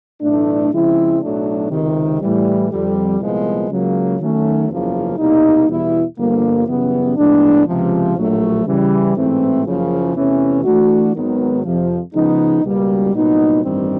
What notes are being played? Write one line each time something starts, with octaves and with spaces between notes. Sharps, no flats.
B1 A2 E3 A3 D4
C#3 F3 G#3 C4 E4
B1 A2 F#3 A3 D4
C#2 C3 D#3
A2 E3 G3
F2 D3 G3
C2 A#2 F3 G#3 B3
C#2 C#3 F#3 A#3
D#3 F#3 A3 C#4
F#1 E2 C#3 F3 A#3
C2 B2 G3 A#3 D#4
E2 B2 G3 B3 E4
G1 G2 D3 F3 A#3
F#2 C#3 E3 G3 B3
A2 F3 G#3 B3 D4
C#2 C3 F3
A#1 A2 F#3 A3
C#3 E3 G3
A1 G#2 E3 A3 C4
F#1 F#2 C#3 F3
E2 C3 E3 A3 C#4
E3 A3 D4 F#4
G#1 G#2 D#3 F#3 B3
F2 C3 F3
C#3 F3 G#3 B3 D#4
C#2 B2 G3 A#3
C2 A#2 F#3 B3 D#4
A1 G2 D#3 G3 C4